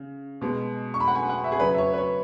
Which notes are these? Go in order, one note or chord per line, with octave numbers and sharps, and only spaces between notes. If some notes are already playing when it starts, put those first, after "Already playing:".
Already playing: C#3
B2 G#3
C#6
B5
F#5
G#5
F#5
E5
G#4
C#3 F#3 B4
E5
C#5
B4
C#5